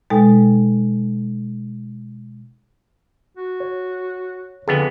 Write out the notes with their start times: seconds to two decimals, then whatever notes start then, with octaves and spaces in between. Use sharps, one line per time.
0.10 B2 G#3 D#4 A4 G5
3.38 F#4
3.60 C#5
4.68 F2 D3 B3 G#4